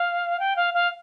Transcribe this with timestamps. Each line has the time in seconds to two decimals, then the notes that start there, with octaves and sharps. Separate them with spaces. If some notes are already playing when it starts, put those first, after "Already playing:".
Already playing: F5
0.39 G5
0.56 F5
0.74 F5